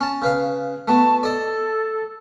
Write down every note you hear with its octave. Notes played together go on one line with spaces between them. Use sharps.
C#4 A5
C#3 B4 F5
A3 B3 F#4 A5
A4 D5 D#5